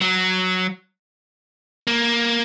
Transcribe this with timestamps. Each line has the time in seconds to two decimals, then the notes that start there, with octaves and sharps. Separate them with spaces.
0.01 F#3
1.87 A#3